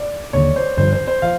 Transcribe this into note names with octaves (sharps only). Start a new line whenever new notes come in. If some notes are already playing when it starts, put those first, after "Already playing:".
Already playing: D5
D#2 D3 F#3 A#3 C#5
C5
G2 D3 F3 C5
C5
C5
F3 F5